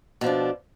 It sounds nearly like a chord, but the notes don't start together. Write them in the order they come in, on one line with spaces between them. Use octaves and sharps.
B2 F3 D4